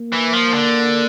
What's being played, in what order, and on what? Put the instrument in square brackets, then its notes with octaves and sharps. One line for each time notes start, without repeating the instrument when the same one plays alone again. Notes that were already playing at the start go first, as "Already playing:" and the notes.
Already playing: [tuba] A#3
[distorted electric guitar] E3
F3
D3